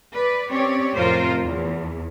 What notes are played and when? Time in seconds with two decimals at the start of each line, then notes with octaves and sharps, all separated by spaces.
0.13 B4 D5
0.49 C4 C#4 G4 C#5 D5
0.95 F2 A2 C3 F4 A#4 C5
1.42 E2